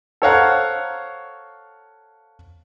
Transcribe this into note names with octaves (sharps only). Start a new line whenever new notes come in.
A4 C5 C#5 F5 F#5 A#5